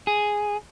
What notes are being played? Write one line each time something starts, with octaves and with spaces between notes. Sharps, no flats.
G#4